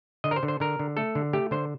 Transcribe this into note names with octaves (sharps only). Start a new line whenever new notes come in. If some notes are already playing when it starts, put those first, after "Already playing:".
D3 D#5
A#4
C5
D3
C5
D3 A#4
D3
A3 A4
D3
A3 G4
D3 C5